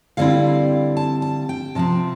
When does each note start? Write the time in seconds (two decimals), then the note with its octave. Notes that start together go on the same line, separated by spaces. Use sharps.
0.17 D3 G3 C4 E4 F5
0.97 A5
1.22 A5
1.49 G5
1.75 C3 F3 C4 A5